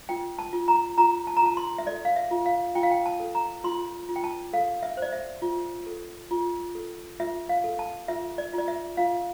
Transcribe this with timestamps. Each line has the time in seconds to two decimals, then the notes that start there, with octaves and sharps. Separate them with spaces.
0.09 F4 G5
0.39 A5
0.53 F4
0.68 A#5
0.98 F4 A#5
1.27 A5
1.37 A#5
1.42 F4 A5
1.57 C6
1.78 E5
1.87 A4 D5
2.05 F5
2.16 E5
2.31 F4
2.46 F5
2.75 F4 G5
2.83 F5
2.91 G5
3.06 A5
3.20 A4
3.35 A#5
3.64 F4 C6
4.09 F4
4.16 G5
4.24 A5
4.53 A4 F5
4.83 E5
4.97 C5 D5
5.12 E5
5.42 F4
5.87 A4
6.31 F4
6.75 A4
7.20 F4 E5
7.49 F5
7.64 A4
7.79 A5
8.08 F4 E5
8.38 D5
8.53 F4
8.58 D5
8.68 E5
8.97 F4 F5